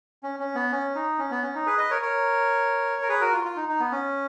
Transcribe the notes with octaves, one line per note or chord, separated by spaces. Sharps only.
C#4
C#4
B3
C#4
D#4
C#4
B3
C#4
D#4
G#4 B4
B4 D#5
A#4 C#5
A#4 C#5
A#4
G#4 B4
F#4 A#4
F4
F4
D#4
D#4
B3
C#4